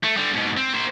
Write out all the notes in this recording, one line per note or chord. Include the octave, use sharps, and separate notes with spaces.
A3
D3 G3
G#2 B2
C4
A#3 C5